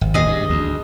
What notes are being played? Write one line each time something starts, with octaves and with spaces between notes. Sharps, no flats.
G#1
D1 D#2 B2 G#4 D#5
G2
D2